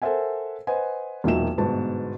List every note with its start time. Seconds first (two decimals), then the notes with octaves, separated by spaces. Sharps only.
0.02 A4 A#4 C5 E5 F#5 G#5
0.67 B4 C5 D#5 F#5 G#5
1.24 E1 A#2 F#3 D#4 E5 E7
1.58 G1 G#2 B2 A5